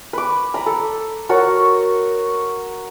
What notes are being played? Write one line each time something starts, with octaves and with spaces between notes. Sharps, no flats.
B4 D6
A#5 B5
A4
F#4 A#4 C#5 A5